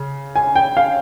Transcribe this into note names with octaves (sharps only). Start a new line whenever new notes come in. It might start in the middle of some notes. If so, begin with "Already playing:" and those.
Already playing: C#3
G#5
G5
F5